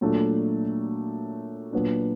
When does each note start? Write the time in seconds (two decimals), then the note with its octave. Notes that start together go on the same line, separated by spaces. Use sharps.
0.01 A#2 F#3 A3 D4
1.73 A#2 F#3 B3 D4